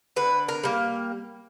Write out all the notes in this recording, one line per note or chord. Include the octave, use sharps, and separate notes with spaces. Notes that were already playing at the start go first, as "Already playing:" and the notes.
D3 B4
A#4
G3 A#3